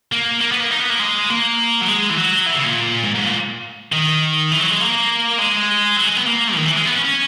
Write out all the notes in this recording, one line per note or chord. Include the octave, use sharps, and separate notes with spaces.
A#3
A#3
B3
A#3
D#4
B3
A#3
G#3
A#3
F#3
G#3
E3
F#3
E3
C#3
A#2
G#2
G#2
A#2
D#3
E3
F#3
G#3
A#3
G#3
F#3
G#3
B3
A#3
D#3
E3
G#3
B3
C#4
C#4